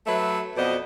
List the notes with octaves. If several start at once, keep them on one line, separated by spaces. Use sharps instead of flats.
F#3 A3 B4 E5
F2 B2 B3 C5 D5 D#5